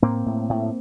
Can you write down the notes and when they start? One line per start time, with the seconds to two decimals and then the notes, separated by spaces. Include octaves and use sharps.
0.02 A2 A#3 C4
0.26 A2
0.50 A2